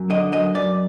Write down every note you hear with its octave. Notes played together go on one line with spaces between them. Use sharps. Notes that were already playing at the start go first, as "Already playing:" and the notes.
Already playing: F#2
D3 D#5
F#2 D#5
F#2 D5